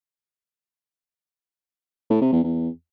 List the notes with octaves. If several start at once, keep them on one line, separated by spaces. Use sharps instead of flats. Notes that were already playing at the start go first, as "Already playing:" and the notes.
A2
C3
E2
E2